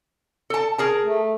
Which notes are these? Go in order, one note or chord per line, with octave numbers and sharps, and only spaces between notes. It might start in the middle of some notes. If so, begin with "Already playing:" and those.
A4 A5
G#4 A#4 A5
A3